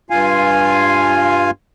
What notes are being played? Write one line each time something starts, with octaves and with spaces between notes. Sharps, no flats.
G2 F4 F5 G#5